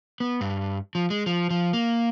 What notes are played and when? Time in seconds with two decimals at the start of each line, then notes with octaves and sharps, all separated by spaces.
0.20 B3
0.41 G2
0.95 F3
1.10 G#3
1.26 F3
1.50 F3
1.73 A#3